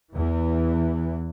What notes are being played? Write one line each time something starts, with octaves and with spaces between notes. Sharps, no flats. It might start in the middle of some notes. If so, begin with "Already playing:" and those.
E2 E3